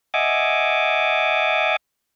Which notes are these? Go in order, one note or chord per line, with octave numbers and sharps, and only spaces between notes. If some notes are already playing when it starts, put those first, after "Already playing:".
D#5 E5 F#5 G#5 D6